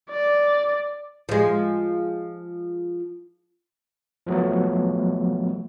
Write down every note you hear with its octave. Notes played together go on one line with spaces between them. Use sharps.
D5
F3 G#3
F3 F#3 A3 B3